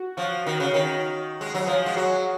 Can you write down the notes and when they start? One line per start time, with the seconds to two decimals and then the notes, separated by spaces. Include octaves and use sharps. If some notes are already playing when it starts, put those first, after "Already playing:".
Already playing: F#4
0.17 F3 F#4
0.46 D#3 F#4
0.60 C#3
0.74 D#3
1.41 G#3
1.55 F#3
1.66 F3 G#4
1.86 G#3
1.96 F#3 F#4